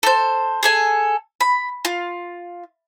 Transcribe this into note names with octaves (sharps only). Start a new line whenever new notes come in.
A4 C5
G#4 A4 G#5
B5
F4